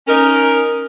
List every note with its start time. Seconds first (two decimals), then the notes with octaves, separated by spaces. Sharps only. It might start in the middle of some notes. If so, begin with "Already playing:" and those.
0.07 C#4 D#4 A#4